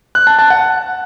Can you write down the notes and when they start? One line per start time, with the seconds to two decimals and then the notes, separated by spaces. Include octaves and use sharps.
0.15 F#6
0.27 A5
0.39 A5
0.50 F#5